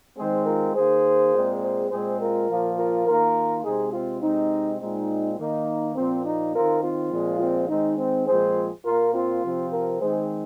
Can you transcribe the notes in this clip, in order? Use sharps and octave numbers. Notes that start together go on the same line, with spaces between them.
D#3 G#3 C4 G#4 C5
F4 A#4
D#3 A#3 G#4 C5
A#2 G#3 C4
G#4 C5
A#2 G#3 C4 G#4 C5
F4 A#4
A#2 F3 A#3
F4 A#4
D#3 A#3 F4 A#4
C3 G#3 C4 D#4 G#4
C4 F4
C3 G#3 C4 D#4
A#2 G#3 C4 D#4
D#3 A#3 D#4
A#2 F3 A#3 C4
D#4
D#3 C4 F4 A#4
C4 F4
A#2 F3 G#3
C4 F4
D#3 G#3 C4 D#4
C4
A#2 F3 G#3 C4 G#4 C5
A#2 A#3 F4 A#4
C4 F4
C3 F3 C4
F4 A#4
D#3 G#3 C4 G#4 C5